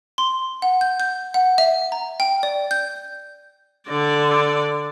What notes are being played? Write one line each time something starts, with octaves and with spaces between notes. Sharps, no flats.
C6
F#5
G6
G6
F#5
E5
A#5
G5
D5
G6
D3 D5